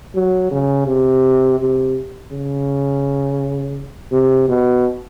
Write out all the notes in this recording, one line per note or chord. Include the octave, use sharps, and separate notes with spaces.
F#3
C#3
C3
C3
C#3
C3
B2